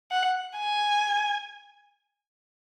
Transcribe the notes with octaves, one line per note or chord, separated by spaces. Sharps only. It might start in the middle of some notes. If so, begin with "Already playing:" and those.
F#5
G#5